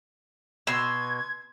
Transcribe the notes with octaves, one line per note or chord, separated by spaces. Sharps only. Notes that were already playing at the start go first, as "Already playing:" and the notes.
B2 C6 E6 G#6